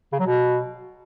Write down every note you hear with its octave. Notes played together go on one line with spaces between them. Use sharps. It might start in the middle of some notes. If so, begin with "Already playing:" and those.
C#3
F#3
B2